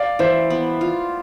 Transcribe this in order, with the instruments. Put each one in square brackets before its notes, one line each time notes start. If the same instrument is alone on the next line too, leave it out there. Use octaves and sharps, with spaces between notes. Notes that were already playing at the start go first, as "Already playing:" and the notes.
Already playing: [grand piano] D5 F5
[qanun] E3 [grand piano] C5 E5
[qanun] B3
F4